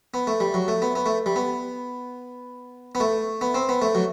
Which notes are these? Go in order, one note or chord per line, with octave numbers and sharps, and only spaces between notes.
B3
A3
G3
F#3
A3
B3
B3
A3
G3
B3
B3
A3
B3
C4
B3
A3
F#3